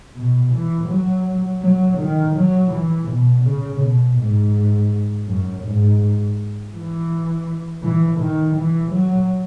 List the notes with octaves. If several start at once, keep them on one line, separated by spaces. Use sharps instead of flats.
B2
E3
F#3
F#3
D#3
F#3
E3
B2
C#3
B2
G#2
F#2
G#2
E3
E3
D#3
E3
F#3